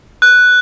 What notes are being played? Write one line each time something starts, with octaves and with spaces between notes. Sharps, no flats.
F#6